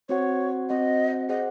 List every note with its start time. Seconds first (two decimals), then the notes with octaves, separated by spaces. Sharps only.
0.09 C4 F#4 C5 C#5 F#5
0.69 C4 F#4 C5 D#5 F#5
1.29 G#4 C5 D#5 F#5